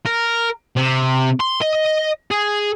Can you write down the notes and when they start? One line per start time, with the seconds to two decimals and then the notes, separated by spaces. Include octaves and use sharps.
0.06 A#4
0.77 C3
1.40 C6
1.62 D#5
2.31 G#4